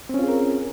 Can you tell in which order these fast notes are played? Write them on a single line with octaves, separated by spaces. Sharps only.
C4 C#4 F4 G#4 A#4